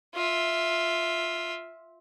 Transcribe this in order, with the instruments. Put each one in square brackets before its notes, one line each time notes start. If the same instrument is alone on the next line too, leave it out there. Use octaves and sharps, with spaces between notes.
[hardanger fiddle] F4 E5